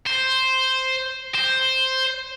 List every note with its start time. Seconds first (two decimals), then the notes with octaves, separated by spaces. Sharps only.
0.06 C5
1.35 C5